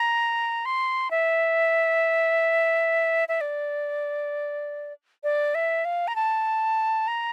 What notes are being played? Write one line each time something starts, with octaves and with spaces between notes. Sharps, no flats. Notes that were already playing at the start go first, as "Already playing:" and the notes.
Already playing: A#5
C6
E5
E5
D5
D5
E5
F5
A#5
A5
A#5